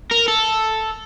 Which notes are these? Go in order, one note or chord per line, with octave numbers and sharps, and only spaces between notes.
A#4
A4